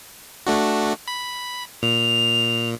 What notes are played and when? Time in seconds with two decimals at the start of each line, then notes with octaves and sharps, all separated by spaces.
0.47 A3 D4 F#4
1.08 B5
1.83 A#2 F7